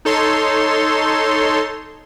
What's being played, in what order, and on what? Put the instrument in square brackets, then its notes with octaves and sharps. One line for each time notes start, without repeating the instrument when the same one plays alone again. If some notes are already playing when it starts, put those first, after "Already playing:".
[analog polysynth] D#4 A4 C#5 C6